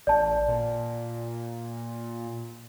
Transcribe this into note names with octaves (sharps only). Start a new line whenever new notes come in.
A1 D5 A5
A#2